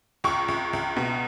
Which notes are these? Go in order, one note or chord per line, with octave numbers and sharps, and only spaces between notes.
C#2 C#6
C#2
C#2
B2